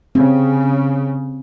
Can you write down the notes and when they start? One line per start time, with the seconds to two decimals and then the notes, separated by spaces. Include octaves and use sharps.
0.15 C#3 C4